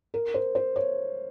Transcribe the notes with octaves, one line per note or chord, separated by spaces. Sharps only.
A#4
C5
C5
C#5